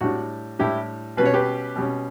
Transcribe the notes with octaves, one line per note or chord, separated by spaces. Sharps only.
A2 G3 D4 F#4
A2 G3 D4 E4 G4
B2 G3 C#4 B4
C#5
G4 B4
B2 G3 C#4